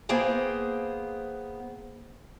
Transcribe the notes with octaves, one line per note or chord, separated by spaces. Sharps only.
A#3 B3 G#4 C5 G5